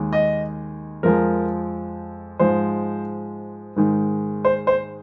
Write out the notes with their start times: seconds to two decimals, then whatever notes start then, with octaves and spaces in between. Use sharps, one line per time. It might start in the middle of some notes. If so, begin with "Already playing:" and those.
Already playing: D#2 D#3 G#3
0.13 D#5
1.03 F2 F3 G#3 A#4
2.39 G#2 F3 G#3 C5
3.76 G#2 D#3 G#3
4.45 C5
4.67 C5